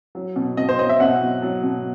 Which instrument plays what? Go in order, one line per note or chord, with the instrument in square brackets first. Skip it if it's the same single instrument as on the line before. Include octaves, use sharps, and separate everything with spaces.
[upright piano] F#3
B2
B2 D#5
C5
F#3 D#5
E5
B2 F#5
F#3
F#3
B2